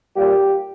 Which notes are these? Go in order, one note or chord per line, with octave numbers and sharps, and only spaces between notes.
A#2 G3 A#3 G4